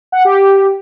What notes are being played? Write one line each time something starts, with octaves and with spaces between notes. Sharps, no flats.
F#5
G4